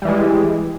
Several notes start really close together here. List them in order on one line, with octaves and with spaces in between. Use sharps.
G3 E3 G#3